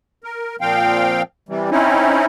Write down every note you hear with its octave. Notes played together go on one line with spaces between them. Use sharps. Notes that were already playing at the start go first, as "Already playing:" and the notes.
A#4
A#2 F3 C4 F5 G5
C3 E3 G3
C4 C#4 D#4 E4